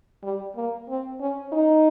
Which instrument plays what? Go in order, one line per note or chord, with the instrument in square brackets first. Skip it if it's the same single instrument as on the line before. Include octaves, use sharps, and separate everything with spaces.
[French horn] G3
A#3
C4
C#4
D#4